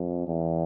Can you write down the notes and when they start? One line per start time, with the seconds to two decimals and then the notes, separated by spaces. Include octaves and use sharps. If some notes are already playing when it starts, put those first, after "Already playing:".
Already playing: F2
0.27 E2